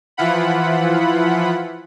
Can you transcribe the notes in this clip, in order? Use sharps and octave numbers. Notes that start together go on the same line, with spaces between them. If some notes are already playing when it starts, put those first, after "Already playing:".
E3 F3 E4 F4 F#5 B5